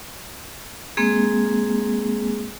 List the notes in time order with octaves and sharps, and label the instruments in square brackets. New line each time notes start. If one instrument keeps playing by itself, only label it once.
[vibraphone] G#3 A#3 C4 G#4